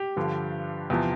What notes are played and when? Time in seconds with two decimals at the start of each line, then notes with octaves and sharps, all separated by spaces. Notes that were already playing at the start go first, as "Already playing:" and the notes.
Already playing: G4
0.16 G2 D3 F3
0.90 E2 C3 F3